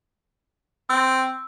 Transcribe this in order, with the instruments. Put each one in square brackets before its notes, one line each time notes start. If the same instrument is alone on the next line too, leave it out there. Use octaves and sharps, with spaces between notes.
[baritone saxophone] C4 [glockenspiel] E6